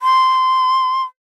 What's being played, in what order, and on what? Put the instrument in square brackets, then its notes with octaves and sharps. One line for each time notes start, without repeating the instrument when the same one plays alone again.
[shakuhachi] C6